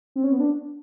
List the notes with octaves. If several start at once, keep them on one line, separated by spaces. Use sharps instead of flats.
C4
C#4
B3
D4